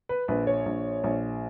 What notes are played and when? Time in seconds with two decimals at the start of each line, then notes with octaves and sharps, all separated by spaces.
0.09 B4
0.28 A#1 B4
0.47 C#5
0.66 A#1
1.04 A#1